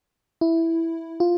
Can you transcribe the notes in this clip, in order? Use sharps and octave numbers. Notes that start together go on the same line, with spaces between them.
E4
F4